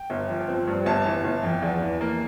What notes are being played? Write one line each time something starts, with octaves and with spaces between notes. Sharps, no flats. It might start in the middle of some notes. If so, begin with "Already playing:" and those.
Already playing: G5
G1
F3
C4
G2
G1 A5
E3
G1
F2
E2
E3
A#3